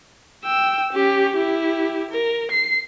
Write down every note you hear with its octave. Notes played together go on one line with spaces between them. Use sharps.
G5 E6
C#4 G4
E4 G4
A#4
C7